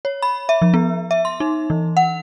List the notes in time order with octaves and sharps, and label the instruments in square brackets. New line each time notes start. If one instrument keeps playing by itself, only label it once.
[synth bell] C#5
B5
E5
F3
B3
E5
C6
D#4
E3
F#5